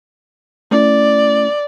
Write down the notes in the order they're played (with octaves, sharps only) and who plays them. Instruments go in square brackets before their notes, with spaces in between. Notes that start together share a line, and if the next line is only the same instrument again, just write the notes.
[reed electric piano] A3 C#4 E4 [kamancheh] D5